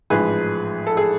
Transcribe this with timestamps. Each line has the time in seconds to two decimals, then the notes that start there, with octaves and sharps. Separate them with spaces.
0.10 A1 G#2 F3 G#3 G#4 B4
0.87 A4
0.97 G#4